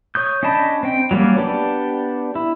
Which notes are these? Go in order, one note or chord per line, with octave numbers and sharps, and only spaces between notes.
C#5 D#6 G6
C#4 D4 D#5 A5 B5
C4 G5
F#3 G3 A#3 C#4
B3 D4 G4
E4